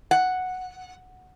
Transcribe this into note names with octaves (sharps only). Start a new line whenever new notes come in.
F#5